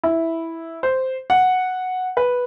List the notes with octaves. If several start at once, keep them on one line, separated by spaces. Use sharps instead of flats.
E4
C5
F#5
B4